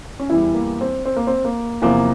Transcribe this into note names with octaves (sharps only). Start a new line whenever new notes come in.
C#4
E2 E3 G3 E4
A#3
C4
C4
A#3
C4
A#3
E2 C3 F3 A#3